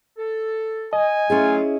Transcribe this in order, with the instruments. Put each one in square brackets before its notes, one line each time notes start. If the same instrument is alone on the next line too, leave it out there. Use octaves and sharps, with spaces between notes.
[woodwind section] A4
[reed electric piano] D#5 [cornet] G#5
[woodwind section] F#3 A3 F4 [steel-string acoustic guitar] C#4 E4 G#4